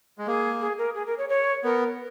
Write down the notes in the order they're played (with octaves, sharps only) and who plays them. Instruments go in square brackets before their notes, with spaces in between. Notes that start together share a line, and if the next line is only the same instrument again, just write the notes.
[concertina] G#3
[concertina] A#3 [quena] G#4
[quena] G#4
A#4
G#4
A#4
C#5
C#5
[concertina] B3 [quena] A#4